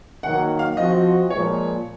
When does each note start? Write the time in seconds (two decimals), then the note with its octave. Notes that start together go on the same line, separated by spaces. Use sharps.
0.23 D#3 F#3 A#3 F#5
0.59 F5
0.77 F3 C4 F#4 D#5
1.30 A#2 F3 G#3 C#5